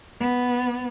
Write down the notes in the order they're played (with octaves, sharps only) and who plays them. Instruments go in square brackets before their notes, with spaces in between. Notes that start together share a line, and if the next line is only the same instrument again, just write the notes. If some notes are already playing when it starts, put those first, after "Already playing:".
[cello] B3